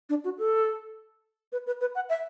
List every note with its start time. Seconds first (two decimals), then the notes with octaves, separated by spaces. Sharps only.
0.09 D4
0.24 F#4
0.38 A4
1.52 B4
1.67 B4
1.81 B4
1.95 F#5
2.09 E5